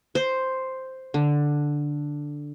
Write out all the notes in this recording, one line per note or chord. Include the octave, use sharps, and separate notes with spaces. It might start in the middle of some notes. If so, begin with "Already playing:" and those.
C5
D3